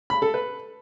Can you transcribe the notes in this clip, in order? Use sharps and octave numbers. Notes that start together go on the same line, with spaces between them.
B5
A4
B4